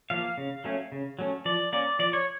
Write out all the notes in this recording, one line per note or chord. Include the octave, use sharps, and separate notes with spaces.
F3 A#3 F5
C#3
F#3 A3 C#4
C#3
F#3 A3 C#4
F3 D5
A#3 C#4 D5
F3 D5
C#5